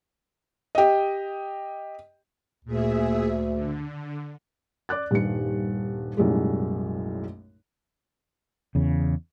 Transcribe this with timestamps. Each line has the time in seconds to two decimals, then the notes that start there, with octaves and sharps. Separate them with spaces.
0.75 G4 D#5
2.65 D2 A#2 G#4 E5
3.54 D3
4.89 D5 D6 F#6 A6
5.11 D#1 G2 D#3 C#7
6.17 B1 F#2 A2 G3 G#3
8.75 E2 C#3